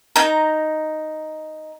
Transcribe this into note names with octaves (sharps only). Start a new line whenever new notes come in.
D#4 A#5